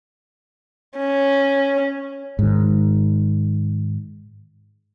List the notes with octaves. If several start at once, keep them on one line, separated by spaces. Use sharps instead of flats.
C#4
G#2 D#3